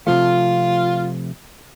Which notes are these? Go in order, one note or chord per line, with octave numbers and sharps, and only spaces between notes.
C3 F3 A3 F4